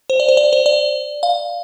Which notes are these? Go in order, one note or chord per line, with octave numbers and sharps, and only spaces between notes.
C5
D5
C5
D5
C5
D5
F5